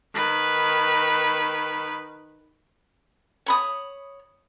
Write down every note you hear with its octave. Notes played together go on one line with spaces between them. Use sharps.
D#3 B4
C#5 B5 D#6